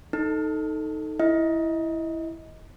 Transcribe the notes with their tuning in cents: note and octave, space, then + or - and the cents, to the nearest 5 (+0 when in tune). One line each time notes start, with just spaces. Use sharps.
D#4 +0 A4 +5
E4 +0 D#5 +20